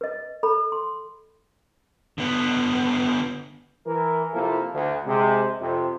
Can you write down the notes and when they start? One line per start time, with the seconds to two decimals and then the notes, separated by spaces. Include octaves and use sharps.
0.01 B4 D#5
0.43 A4 B5
0.72 C6
2.18 D3 B3
3.86 E3 A#4
4.33 C3 F3 A#3 E4 A4 A#4
4.74 D2
5.06 C3 G#3
5.60 F2 C3